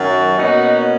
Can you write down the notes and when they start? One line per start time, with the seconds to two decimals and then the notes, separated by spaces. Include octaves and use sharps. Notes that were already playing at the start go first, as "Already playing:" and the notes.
Already playing: F#2 D#3 F#3
0.37 B2 A#3 C#4 D#4 F#4